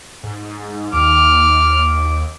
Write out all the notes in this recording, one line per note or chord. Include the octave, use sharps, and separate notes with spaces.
G#2
D#2 D6 F6